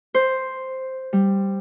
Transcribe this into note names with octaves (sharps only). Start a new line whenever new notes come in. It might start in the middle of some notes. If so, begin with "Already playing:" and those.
C5
G3